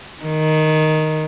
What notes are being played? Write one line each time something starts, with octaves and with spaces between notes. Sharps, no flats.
D#3